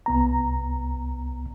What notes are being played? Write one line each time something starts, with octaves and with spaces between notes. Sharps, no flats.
C2 B3 A#5